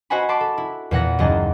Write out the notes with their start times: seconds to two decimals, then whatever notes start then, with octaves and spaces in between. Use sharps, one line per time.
0.10 F#4 C5 D#5 F#5 G#5 B5
0.29 A5 B5 C6 D6
0.41 A4
0.58 E4
0.91 E2 A#2 F#5 A#6
1.19 F#1 D#2 G#4 D#5 A6